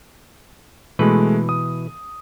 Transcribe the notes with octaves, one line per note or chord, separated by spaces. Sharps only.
B2 E3 G#3 A3 B4
D#6